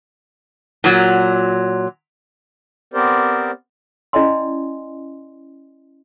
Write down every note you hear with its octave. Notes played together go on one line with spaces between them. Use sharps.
A#2 F#3
B3 C4 G4 A#4 C5 D5
C#4 E4 D5 D#5 G#5 C6